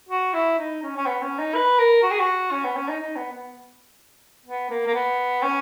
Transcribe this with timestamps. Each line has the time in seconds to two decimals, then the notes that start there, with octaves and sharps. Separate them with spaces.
0.09 F#4
0.34 E4
0.58 D#4
0.82 C#4
0.96 C#4
1.06 B3
1.22 C#4
1.39 D#4
1.55 B4
1.79 A#4
2.03 F#4
2.11 G#4
2.20 F#4
2.51 C#4
2.64 B3
2.76 C#4
2.89 D#4
3.00 D#4
3.16 B3
3.33 B3
4.46 B3
4.70 A#3
4.87 A#3
4.94 B3
5.42 C#4